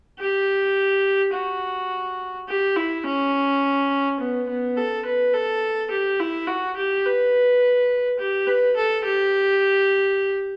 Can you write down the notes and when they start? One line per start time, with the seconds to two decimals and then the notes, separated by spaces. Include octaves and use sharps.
0.19 G4
1.34 F#4
2.48 G4
2.76 E4
3.06 C#4
4.20 B3
4.48 B3
4.77 A4
5.05 B4
5.34 A4
5.91 G4
6.20 E4
6.47 F#4
6.76 G4
7.05 B4
8.19 G4
8.47 B4
8.76 A4
9.04 G4